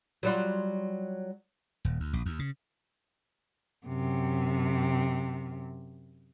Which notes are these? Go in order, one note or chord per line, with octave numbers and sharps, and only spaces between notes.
F#3 G3 F4
D#1
D2
A#1
D#2
C#3
F#2 C3